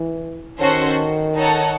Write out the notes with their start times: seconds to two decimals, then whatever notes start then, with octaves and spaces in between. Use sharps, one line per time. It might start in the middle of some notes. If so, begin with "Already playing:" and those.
Already playing: E3
0.60 D#3 C#4 F#4 A4 C5
1.36 D#4 A4 C#5 F#5 A5